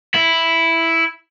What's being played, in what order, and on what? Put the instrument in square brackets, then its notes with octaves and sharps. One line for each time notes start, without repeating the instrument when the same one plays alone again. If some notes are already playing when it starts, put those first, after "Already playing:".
[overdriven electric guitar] E4